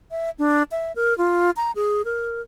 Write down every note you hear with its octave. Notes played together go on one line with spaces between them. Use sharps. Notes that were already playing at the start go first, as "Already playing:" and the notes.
E5
D4
E5
A#4
F4
A#5
G#4
A#4